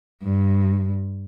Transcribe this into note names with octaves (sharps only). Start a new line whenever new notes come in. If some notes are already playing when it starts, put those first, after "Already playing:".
G2